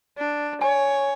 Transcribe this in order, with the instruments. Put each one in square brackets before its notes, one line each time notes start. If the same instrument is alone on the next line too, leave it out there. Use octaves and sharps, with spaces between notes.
[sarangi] D4
[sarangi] C#5 [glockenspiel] G#5